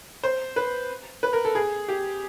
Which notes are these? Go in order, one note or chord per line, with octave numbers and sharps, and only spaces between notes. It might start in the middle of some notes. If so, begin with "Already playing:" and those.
C5
B4
B4
A#4
A4
G#4
G4